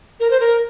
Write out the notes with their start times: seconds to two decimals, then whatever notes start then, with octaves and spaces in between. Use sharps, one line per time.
0.20 A#4
0.31 C5
0.40 A#4